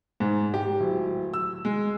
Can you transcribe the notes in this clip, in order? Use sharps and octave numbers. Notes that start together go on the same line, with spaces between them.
G#2
G4
D1
E6
G#3